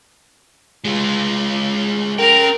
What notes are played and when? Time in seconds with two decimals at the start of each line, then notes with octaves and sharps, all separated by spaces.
0.85 G#3 F4
2.19 C#4 A#4 G5 A#5